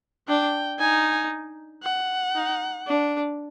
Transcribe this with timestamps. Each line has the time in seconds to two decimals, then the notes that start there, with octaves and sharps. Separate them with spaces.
0.28 D4 G5
0.79 D#4 G#5
1.83 F#5
2.35 D#4
2.87 D4